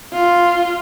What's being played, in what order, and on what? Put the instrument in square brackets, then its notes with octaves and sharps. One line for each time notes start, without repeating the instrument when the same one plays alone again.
[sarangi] F4